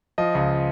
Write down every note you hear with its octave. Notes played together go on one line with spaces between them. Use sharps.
F3 D#5
C#2